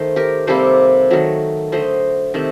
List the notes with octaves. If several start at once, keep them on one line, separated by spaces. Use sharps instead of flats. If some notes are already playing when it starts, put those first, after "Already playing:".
Already playing: D#3 A3 C5
G4 A#4
C3 G3 A#3 A4 C5
D#3 F#3 A3
D3 A3 C5 D#5
C3 D#3 A3